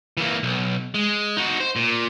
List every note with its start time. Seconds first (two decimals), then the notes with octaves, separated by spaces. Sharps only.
0.17 E3 A#3
0.43 B1
0.94 G#3
1.37 D#4 F#4
1.60 C5
1.76 A#2